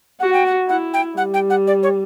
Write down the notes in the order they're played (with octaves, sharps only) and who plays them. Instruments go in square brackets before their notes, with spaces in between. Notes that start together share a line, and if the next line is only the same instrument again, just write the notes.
[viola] F#4 [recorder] F#5
[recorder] G5
F#5
[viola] E4 [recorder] F#5
[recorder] G5
[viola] G3 [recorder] F#5
[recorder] G5
F#5
D5
C#5